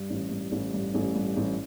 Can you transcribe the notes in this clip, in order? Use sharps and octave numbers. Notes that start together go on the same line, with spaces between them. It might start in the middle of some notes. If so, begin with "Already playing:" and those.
Already playing: G2
A1
G2
A1
G2
A1
G2
A1